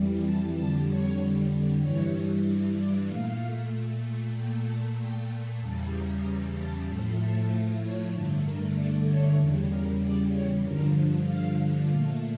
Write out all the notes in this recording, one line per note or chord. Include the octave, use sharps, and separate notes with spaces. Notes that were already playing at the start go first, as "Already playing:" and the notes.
Already playing: F2 E3 G3
A5
F2 D3 G3 A5
C#5
G2 E3 G3 C#5
D5
A#2 A3 F5
A#2 A3 G5
A5
G5
E2 C#3 G3 A5
A#5
A#5
A5
A2 F3 A3
A5
C#5
G2 D3 A3
A#4
D5
C#5
E2 C#3 G3
A#4
D5
C#5
G2 D3 F3 A#4
F5
A#2 A3 F5